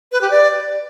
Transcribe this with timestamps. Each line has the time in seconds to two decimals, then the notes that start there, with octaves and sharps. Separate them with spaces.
0.12 B4
0.21 G4
0.31 D5